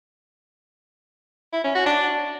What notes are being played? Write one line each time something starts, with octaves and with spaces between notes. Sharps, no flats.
E4
C#4
F#4
D4